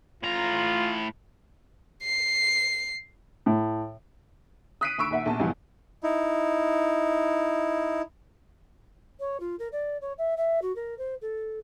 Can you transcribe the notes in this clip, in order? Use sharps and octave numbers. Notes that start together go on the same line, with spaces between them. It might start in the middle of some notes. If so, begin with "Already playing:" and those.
A2 F4 A#5
C7
A2
D#6 F#6 B6 C7 D7 D#7
D2 B5 C#6 E6 D7
D#2 A#2 E5 F#5
A#1 B2 A5
C#2 G2 B2 E3 F3 B3
D#4 E4
C#5
F4
A#4
D5
C#5
E5
E5
F#4
A#4
C5
A4